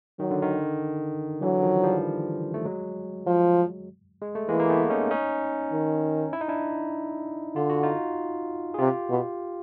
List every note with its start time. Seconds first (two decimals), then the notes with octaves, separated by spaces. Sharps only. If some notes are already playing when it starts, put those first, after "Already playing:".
0.20 D#3 F#3
0.31 D3
0.42 D#3
1.42 D3 E3 F#3
1.63 D#3 F3
1.83 F3 G3
2.54 A3
2.65 F#3 G#3
3.27 F3
4.21 G#3
4.35 A3
4.49 E3 G#3 A#3
4.60 A#3
4.70 A3 B3
4.90 C#4 D#4
5.11 C#4 D#4
5.72 D#3
6.33 E4
6.41 D#4
6.48 D4 E4
7.56 D3 F4
7.70 F#4
7.83 D#4 F4
8.74 G#4
8.79 C3 F4 G4
9.10 B2